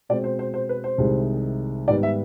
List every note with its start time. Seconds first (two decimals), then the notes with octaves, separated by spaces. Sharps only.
0.09 B2 G#3 C4 D5
0.24 C5
0.39 C5
0.54 C5
0.69 B4
0.84 C5
0.98 C2 C3 D#3 G#3
1.88 G#2 D#3 G3 B3 D5
2.03 E5